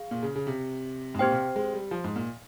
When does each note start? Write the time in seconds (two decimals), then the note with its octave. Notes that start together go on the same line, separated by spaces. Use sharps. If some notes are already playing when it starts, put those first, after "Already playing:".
Already playing: G#4 F5
0.11 A#2
0.23 C#3
0.35 C#3
0.47 C3
1.15 G#2
1.19 A#2 C4 G4 C5 G5
1.32 C3
1.56 G#3
1.74 G3
1.91 F3
2.04 G#2
2.16 A#2